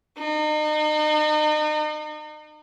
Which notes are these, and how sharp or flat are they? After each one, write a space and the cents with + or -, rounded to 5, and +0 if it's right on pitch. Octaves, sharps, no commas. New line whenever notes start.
D#4 -35